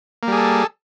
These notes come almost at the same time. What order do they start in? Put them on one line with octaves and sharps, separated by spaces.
A#3 G3 G#4 A4